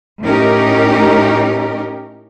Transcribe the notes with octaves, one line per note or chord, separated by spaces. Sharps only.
A2 C#4 D#4 G4 A#4